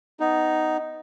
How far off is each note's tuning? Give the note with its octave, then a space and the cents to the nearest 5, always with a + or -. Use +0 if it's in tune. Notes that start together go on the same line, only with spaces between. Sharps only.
B3 +15 D#4 +0